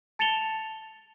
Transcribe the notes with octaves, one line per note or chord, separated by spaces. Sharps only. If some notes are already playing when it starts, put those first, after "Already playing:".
A5 A6 C#7 E7 F7 G7